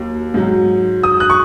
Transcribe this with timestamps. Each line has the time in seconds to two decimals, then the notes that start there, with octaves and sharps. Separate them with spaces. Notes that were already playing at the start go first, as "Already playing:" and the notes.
Already playing: D#2 F#3
0.34 G#2 F#3
1.03 D#6
1.20 F#6
1.30 C#6